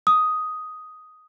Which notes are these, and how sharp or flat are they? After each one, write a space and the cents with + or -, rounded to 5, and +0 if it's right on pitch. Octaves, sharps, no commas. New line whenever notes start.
D#6 +5